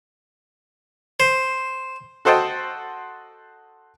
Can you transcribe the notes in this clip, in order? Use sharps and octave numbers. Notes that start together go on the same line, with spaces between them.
C5
F#4 A4 C5 D#5 G5 A5